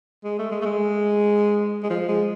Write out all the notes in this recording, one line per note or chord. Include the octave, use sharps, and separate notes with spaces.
G#3
A3
G#3
A3
G#3
G#3
F3
G#3